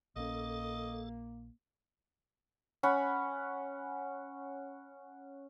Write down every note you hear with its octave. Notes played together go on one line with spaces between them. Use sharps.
A#1 A#3 C#4 A4 D#5
C#4 F#5 B5